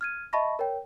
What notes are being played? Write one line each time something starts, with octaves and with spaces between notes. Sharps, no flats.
F6 G#6 D#7
D#5 E5 A5 B5 C#6 A#6
A#4 C#5 G5